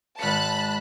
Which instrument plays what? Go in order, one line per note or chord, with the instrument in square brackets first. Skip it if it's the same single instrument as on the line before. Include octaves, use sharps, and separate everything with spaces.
[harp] G#1 C#7 [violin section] A5 B5 F#6